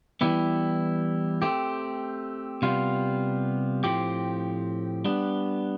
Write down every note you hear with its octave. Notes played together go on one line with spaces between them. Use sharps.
E3 G3 B3 E4 G4
A3 C4 G4
C3 G3 B3 F4
A2 F3 C4 G4
G3 B3 D4